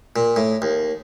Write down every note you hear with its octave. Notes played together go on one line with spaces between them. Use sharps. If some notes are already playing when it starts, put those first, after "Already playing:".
A#2
A2
D#2